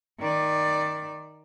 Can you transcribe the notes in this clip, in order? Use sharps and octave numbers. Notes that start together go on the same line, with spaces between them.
D#3 D5